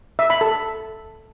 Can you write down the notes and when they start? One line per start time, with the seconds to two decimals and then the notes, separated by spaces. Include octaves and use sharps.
0.19 E5
0.30 B5
0.41 A4